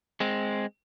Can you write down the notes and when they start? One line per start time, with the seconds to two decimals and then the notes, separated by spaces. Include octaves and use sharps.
0.20 G#3 C4